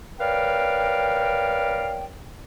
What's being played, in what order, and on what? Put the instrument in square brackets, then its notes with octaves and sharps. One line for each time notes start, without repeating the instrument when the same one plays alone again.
[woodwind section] A#4 B4 C#5 D5 F5 G5